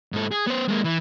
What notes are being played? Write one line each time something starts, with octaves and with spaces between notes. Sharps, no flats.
G#2 A4
G#4
B3 C5
G#3 A#3
E3